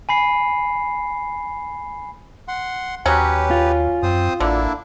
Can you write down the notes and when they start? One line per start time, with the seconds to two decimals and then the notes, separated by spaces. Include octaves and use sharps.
0.09 G#5 B5 C7
2.48 F#5 C6
3.06 D#2 F#3 C#4 G4 B4
3.51 F4
4.03 F#2 C4 C5 D#6
4.40 A1 D3 A#3 D4 E4